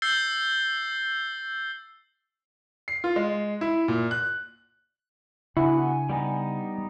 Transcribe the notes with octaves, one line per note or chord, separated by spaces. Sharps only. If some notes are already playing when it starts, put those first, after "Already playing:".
E6 G6 A6 C7 G7
C7
F4
G#3
E4
A#2
F#6
C#3 B3 D4 E4 F#4 G#5
G3 B3 D#4